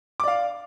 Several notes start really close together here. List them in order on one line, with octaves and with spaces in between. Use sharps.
D6 D5 F5